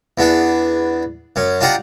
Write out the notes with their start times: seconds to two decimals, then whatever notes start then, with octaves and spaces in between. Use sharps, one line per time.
0.18 E2 B3 D4 G#4
1.36 F#2 C#4
1.61 D4 F4 G4 D#5 F#5 A#5